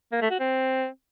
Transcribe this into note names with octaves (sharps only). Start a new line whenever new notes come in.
A#3
A3
F#4
C4